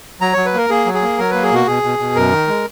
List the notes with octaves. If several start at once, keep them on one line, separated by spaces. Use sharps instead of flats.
F#3 A#5
F#3 C#5
B4
A#3 A#4
A#3 G#4
F#3
G#4
A#3
F#3 A#4
A#3 B4
G#4
B2 F#4
B2 G#4
B2
B2
F#2 A#4
D#3
G#3